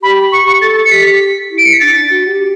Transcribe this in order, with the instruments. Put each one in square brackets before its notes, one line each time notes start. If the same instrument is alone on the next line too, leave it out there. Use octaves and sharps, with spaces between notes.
[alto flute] G4 [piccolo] B5
[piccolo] C#6
C#6
[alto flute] A4 [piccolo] A6
[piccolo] A6
C#7
[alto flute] G4 [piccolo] B6
[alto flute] E4
[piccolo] D7
C#7
B6
[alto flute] D4 [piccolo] A6
[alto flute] F#4
G4